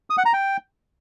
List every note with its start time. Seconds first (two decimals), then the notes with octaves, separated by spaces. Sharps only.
0.10 D#6
0.18 F#5
0.25 A#5
0.33 G5